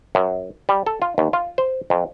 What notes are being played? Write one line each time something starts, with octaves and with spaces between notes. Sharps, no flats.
F#2
G3
A4
F4
D#2
F4
C5
F2